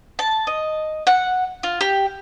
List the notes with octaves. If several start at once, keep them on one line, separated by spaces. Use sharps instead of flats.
A5
D#5
F#5
F4
G4